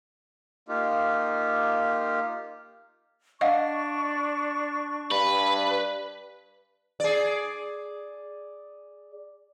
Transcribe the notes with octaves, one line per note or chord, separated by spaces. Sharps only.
A#3 D#4 F4 G4
D4 D#5 F5 F#5 C#6
G2 B4
G#4 D5